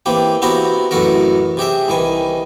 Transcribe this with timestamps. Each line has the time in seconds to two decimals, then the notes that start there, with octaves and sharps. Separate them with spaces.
0.06 E3 A#3 C4 G4
0.42 B3 C4 E4 F#4 G4 A#5
0.91 A1 F#2 E3 F#4 A4 A#4
1.57 C3 G4 G#4 E5
1.88 C2 D#3 E3 G#5